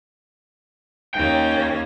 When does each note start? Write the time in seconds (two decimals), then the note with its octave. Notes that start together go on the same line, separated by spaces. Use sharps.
1.15 D#2 A#3 C#4 G5